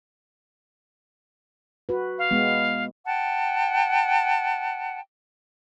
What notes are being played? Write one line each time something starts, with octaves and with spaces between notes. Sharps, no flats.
F#4 B4
F5
G#3 B3
F#5 G5 A5